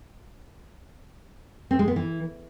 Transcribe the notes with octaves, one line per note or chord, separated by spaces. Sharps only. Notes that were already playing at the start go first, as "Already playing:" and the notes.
C4
G#3
B3
E3